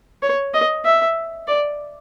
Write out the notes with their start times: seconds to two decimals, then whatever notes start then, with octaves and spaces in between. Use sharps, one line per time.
0.23 C#5
0.54 D#5
0.85 E5
1.47 D5